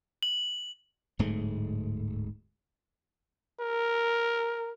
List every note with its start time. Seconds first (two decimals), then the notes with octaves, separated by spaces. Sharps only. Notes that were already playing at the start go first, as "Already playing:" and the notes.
0.23 F#7
1.19 D1 G#2 G#3 A3
3.60 A#4